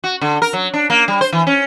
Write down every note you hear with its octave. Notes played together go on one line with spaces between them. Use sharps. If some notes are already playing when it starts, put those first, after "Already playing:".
F#4
D3
A#4
F#3
D4
A#3
G3
C5
E3
C#4